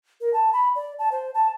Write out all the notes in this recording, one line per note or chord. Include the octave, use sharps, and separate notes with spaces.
A#4
A5
B5
D5
A5
C5
A5